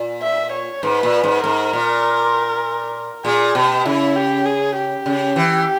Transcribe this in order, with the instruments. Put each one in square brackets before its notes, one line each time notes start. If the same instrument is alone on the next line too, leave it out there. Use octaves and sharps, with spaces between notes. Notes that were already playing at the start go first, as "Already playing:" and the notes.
Already playing: [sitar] A#2
[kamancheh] E5
C#5
[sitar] G#2 [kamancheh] B4
[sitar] A#2
G#2
[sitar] G#2 [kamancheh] A#4
[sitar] A#2
[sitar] A#2 [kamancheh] G#4
[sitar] B2 [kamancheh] G4
[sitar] C#3 [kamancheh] E4
[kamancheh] G4
G#4
G4
[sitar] C#3
E3